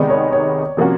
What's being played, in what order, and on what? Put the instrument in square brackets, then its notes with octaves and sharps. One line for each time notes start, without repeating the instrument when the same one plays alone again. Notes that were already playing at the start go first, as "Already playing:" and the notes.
Already playing: [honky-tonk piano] C3 D#3 G#3 B3 D#4 [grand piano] D5
[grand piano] C#5
C#5
[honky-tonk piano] C3 F3 A#3 C#4 F#4